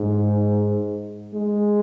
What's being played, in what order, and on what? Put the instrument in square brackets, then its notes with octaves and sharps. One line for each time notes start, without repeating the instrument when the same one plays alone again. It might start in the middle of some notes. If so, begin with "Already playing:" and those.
Already playing: [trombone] G#2
G#3